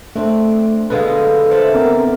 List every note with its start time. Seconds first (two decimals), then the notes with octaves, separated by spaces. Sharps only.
0.16 A3 C4 D4
0.90 B2 D3 G#3 B4 F5
1.51 A4 C5 D5 E5
1.74 B3 C4 A#4